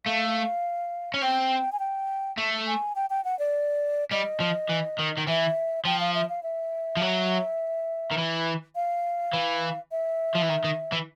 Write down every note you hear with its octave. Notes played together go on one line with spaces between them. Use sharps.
A3 F5
C#4
C4 G5
G#5
G5
A3
G#5
G5
G5
F#5
D5
G3 D#5
F3
E3
D#3
D#3
E3 E5
F3 G5
F5
E5
F5
E5
F3
F#3
D#3
E3
F5
E3
E5
F3
E3
D#3
D#3
E3